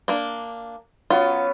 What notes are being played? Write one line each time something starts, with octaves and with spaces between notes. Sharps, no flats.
A#3 D4
F#3 B3 C#4 F4